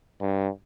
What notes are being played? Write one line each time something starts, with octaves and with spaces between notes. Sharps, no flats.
G2